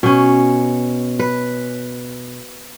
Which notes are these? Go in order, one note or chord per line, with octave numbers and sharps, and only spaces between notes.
B2 C#4
B4